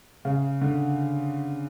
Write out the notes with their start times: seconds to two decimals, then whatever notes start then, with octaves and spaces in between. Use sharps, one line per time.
0.25 C#3
0.61 D3